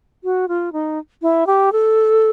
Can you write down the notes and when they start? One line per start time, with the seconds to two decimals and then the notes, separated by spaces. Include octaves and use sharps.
0.24 F#4
0.48 F4
0.73 D#4
1.22 E4
1.47 G4
1.72 A4